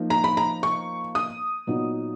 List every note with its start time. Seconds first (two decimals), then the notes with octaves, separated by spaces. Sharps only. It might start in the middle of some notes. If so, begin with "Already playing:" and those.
Already playing: F3 A#3 D#4
0.10 A#5
0.24 B5
0.37 A#5
0.63 C#6
1.15 D#6
1.67 A#2 F#3 B3 D#4